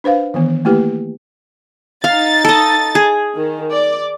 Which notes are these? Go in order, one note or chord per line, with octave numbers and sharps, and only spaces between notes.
D4 B4 C5 F5
D#3 E3 B3
A3 A#3 E4 G4 B4
D#4 F5 A6
A4 D#5
G#4
D#3
D5